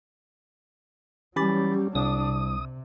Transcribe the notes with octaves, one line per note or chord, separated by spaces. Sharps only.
E3 F#3 G3 C#4 G4 B5 A6
C2 D4 D#6
C3